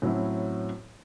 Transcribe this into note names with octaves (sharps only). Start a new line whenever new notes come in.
A2 F#3 C4 C#4 E4